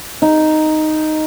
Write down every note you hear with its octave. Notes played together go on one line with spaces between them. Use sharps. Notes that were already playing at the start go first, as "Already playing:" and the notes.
D#4